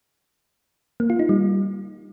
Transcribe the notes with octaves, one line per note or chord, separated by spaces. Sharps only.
A#3
F4
D#4
G3